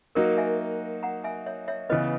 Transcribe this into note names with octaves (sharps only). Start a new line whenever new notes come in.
F#3 A#3 D#4 F#4 A#4
E5 G#5
F#5 A#5
E5 G#5
C#5 E5
C#5 E5
C#3 E3 B3 B4 D#5